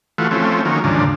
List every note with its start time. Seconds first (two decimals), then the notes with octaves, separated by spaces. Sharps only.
0.18 E3 A3 F4 F#4
0.31 F3 A3 C4 C#4
0.65 D#3 F#3 A#3 C#4
0.84 D#2 G#2 C#3 F3 D4